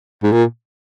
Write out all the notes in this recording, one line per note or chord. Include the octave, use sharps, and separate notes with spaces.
G#2
A#2